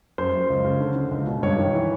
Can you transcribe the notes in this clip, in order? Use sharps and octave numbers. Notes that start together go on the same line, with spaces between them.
F#2 C5
F#2
C#2
C#3
D3
D3
C#2
B2
G2 C#5
D#3
E3